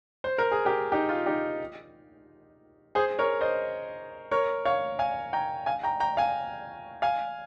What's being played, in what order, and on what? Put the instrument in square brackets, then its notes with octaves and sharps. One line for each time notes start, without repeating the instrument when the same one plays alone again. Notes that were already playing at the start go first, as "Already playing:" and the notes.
[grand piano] C5
A#4
G#4
G4 A#4
D#4 G4
F4
D#4 G4
G#4 C5
A#4 C#5
C5 D#5
A#4 C#5
C#5 F5
F5 G#5
G5 A#5
F5 G#5
G5 A#5
G5 A#5
F5 G#5
F5 G#5